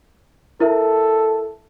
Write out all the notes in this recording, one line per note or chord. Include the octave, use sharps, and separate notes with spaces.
E4 A4 A#4 E5